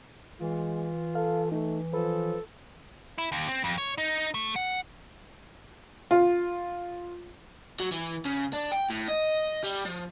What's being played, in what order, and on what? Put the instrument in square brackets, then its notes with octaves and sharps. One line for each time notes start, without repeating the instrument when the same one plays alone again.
[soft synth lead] E3 [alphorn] G#3 [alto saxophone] F4
[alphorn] A4 [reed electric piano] F5
[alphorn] A3 [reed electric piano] D#4
[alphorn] F3 [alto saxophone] A4 [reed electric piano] B4
[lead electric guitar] E4
D#2
C4
F2
C#5
D#4
A3
F#5
[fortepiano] F4
[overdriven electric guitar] F#3
E3
C#3
D4
G5
A2
D#5
G3
F3